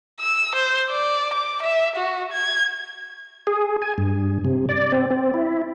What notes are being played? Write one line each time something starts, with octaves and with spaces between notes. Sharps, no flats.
E6
C5
D5
D6
E5
F#4
G#6
G#4
G#5
G2
C3
D5
C4
C4
E4